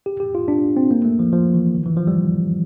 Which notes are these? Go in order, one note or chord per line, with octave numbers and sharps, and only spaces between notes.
G4
G4
F4
D4
C4
A#3
A3
F3
F3
E3
D#3
E3
F3
G3